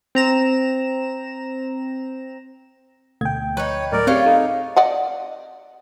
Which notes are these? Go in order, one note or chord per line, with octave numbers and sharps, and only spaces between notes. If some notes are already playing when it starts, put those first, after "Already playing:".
C4 A#5 E7
D2 B2 A3 G5 G#6
F3 D#4 B4 C#5
A2 F#3 A3 A#4 D5
C4 C#4 F4 G4 G#4 B4 C#5
D#4 G#4 A4
D5 D#5 F#5